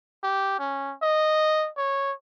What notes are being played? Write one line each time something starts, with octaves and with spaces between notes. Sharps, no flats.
G4
C#4
D#5
C#5